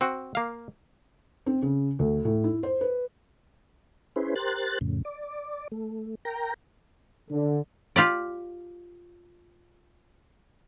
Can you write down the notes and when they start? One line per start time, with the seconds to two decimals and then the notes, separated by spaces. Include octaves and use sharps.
0.01 C4 F#4
0.35 A#3 F5
1.46 C4
1.62 C#3
1.99 D2
2.25 A2
2.44 E4
2.63 C5
2.81 B4
4.16 C#4 E4 G#4 B4 C5
4.36 G4 A#4 C5 F#6 A6
4.81 F2 A2 C#3
5.05 D5
5.72 A3
6.25 A#4 G5 A#5
7.30 D3
7.96 F4 G4 D5